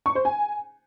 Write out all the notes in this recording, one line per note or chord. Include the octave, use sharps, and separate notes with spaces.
C#6
C5
G#5